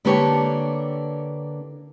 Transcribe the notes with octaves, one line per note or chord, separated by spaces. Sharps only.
D3 A#3 B3 D4 G4 C#5